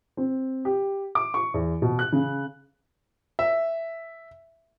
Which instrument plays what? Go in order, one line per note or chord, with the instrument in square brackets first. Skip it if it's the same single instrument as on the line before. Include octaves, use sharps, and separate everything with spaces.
[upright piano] C4
G4
D6
C#6
E2
B2
F#6
C#3
[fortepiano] E5